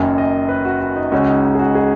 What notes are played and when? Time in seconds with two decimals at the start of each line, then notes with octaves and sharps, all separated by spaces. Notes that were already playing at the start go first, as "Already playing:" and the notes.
Already playing: F#1 F#2 D#3 G#5
0.18 D#5
0.49 B4
0.65 F#4
0.80 F#4
0.96 D#4
1.12 C#2 C#3 G#3 C#4 F#4
1.28 D#4
1.44 D#4
1.55 G#4
1.59 F#4
1.75 G#4